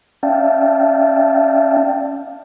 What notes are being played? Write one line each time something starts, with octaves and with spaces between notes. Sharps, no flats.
C#4 D5 E5 F5 G5 A5